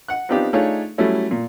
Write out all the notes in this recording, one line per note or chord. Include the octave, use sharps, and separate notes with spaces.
F#5 F#6
B3 C4 D4 D#4 F4 G4
A3 D4 D#4 F4 G#4 C#5
F#3 G3 A3 C#4 E4
A#2